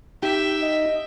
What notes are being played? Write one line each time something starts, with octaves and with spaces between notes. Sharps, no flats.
D#4 G4 E5 G5
D#5